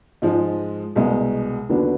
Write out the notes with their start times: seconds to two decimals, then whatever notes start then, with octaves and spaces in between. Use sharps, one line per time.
0.22 G#2 F3 G#3
0.96 C2 B2 G#3
1.69 D#2 D3 F#3 B3 D4